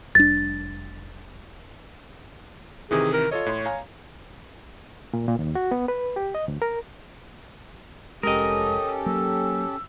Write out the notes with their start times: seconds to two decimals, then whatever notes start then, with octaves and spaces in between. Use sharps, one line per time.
0.15 F1 G3 D4 A6
2.91 C3 D#3 E3 G#4
3.13 A#4
3.31 F4 A4 C#5 D#5
3.46 A2 C6
3.65 F5 G#5 A#5
5.13 A#2
5.28 A#2
5.39 D#2
5.55 F#4
5.71 B3
5.88 B4
6.16 G4
6.35 D#5
6.48 D2
6.62 A#4
8.23 F1 G#3 C#4 G4 A4 A#4 D#5 D#6
9.06 F#3 A#3 E6